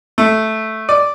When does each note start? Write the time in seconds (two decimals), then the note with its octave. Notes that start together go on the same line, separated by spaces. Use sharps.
0.18 A3
0.89 D5